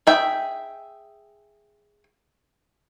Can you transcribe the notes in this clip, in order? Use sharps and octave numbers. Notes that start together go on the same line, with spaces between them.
G#4 E5 G5